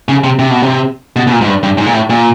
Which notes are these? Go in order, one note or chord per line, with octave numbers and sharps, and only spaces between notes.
C#3
C3
C3
B2
C3
B2
B2
A#2
G#2
G2
G2
G#2
A#2
A2
A#2